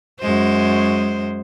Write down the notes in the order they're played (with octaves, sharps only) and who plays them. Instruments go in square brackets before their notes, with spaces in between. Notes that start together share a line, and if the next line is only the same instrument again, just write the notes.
[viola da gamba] F#2 G#3 C5